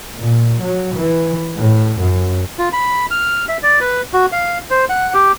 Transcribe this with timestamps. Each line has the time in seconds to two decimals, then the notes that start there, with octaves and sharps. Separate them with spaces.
0.14 A#2
0.60 F#3
0.94 E3
1.57 A2
1.99 F#2
2.59 F4
2.73 B5
3.11 F6
3.49 E5
3.63 D5
3.81 B4
4.13 F#4
4.32 F5
4.70 C5
4.89 F#5
5.14 G4